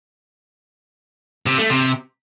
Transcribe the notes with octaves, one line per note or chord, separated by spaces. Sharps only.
C3
A3
C3